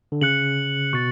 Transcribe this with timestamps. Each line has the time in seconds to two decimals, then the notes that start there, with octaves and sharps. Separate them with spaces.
0.12 D3
0.21 C#3 F#6 C#7 F#7
0.93 B2 C#6 F#6 A6 C#7